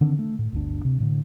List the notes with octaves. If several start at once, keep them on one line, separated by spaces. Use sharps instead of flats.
D3 D#3 C4 D4
A3
A2
G1 D2 D4
C3
A2 D3